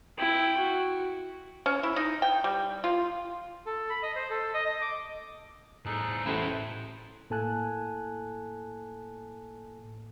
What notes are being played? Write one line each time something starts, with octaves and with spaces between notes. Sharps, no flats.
E4 G5
F#4
C#4
E4
D#4
G5
G3
F4
A4
B5
D#5
C5
A4
D#5
D#5
D6
A2 D#4 G#4 A4 F#6
A1 A3 E4 C5 F#5 G5
A2 A#3 A4 G#5 A5 F#6